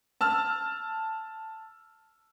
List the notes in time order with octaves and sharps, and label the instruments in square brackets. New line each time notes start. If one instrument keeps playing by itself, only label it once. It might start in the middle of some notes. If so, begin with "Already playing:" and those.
[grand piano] A5 E6 F6